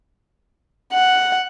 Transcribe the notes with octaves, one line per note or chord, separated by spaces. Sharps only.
F#5